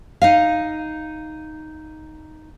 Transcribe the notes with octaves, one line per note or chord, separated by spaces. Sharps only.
D#4 D#5 F5